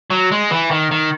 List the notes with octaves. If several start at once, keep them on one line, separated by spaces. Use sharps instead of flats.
F#3
G#3
E3
D#3
D#3